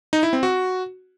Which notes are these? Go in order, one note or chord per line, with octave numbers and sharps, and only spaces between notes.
D#4
E4
C4
F#4